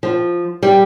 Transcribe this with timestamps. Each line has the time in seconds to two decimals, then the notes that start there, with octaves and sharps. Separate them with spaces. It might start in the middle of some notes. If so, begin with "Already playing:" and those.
0.03 F3
0.63 G3